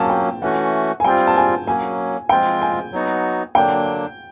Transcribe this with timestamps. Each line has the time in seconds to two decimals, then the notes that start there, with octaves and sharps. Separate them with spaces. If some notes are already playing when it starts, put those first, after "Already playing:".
Already playing: F#3 A#3 C#4 A5
0.10 G5
0.42 E3 A3 C#4 F#4 F#5
1.00 G#5
1.04 G3 C4 F4 G5
1.27 A5
1.36 G#5
1.67 F#3 A#3 C#4 G#5
2.29 F3 G#3 C4 F4 G5
2.62 G#5
2.92 F#3 B3 D#4 F#4
3.55 D3 F#3 A#3 D4 G5